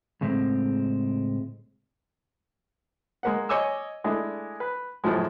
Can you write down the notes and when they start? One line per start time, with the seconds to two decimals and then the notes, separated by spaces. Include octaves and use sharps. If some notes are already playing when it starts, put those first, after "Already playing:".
0.21 C#2 A2 G#3 C4
3.23 G#3 A#3 F#5
3.49 C#5 D#5 G#5 D6 E6
4.04 G#3 A3 D4 E4
4.60 B4
5.04 C#2 F#2 A2 F3 G#3